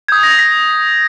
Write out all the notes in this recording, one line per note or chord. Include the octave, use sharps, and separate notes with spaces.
D#6 G6 G#6
A#6
B6